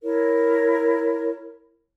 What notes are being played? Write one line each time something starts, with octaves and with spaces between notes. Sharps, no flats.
E4 A#4 C#5